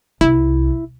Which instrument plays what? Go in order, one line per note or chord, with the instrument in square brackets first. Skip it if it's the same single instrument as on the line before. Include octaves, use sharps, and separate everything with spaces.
[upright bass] C2 [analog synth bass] E4